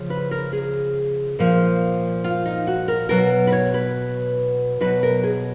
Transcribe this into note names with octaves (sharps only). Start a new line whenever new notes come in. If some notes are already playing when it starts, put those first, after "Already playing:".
Already playing: C#3 F3
B4
A#4
G#4
A#2 F3
F4
D#4
F#4
A#4
B2 F#3 A#4
B4
C#5
B4
B2 F#3 B4
A#4
G#4